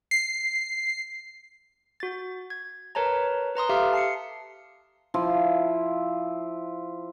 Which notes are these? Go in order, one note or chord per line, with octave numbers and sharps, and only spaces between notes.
C7
F#4 A6
G#6
A#4 B4 C#5 A5 A#5
B4 A#5 C6 D#6
G4 A4 E5 F5 F6
A5 C7 C#7
F3 E4 F4